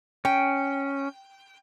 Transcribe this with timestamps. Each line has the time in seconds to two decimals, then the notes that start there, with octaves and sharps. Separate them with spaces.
0.25 C#4 G5